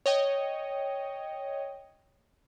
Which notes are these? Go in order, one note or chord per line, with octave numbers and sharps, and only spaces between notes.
C#5 D#5 G5